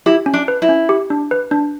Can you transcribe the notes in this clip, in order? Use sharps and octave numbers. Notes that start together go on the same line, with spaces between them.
E4 G4
C#4
D4
B4
E4
C#4
G4
D4
B4
D4